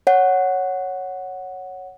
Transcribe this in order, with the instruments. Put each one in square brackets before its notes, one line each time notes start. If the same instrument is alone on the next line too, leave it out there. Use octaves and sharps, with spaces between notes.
[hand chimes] C#5 F#5